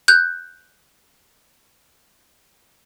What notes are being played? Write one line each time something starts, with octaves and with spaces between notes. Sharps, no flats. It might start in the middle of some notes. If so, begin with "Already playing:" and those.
F#6 G6